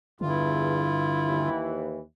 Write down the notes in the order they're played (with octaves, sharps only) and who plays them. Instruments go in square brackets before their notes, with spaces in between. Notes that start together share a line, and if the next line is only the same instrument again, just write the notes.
[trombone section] E2 [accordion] G2 F4 [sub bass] D3 [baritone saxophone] E4
[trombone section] D#2 E3